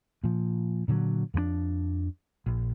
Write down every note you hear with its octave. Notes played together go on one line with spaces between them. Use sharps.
A#2 F3
A#2 D3 E3 F#3
F2 F3 G#3 D4
A#1